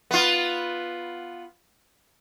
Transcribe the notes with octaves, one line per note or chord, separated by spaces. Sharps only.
B3 F4